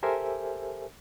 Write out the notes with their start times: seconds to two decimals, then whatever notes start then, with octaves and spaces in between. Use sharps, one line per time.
0.03 G4 A4 A#4 C5 E5 G#5